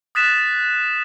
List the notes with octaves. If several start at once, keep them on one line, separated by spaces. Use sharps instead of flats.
D#6 F#6 A6 B6 E7